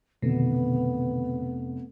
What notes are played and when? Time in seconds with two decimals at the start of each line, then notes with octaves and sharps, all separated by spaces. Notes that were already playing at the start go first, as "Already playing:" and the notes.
0.22 F1 B2 D3 D#3 B3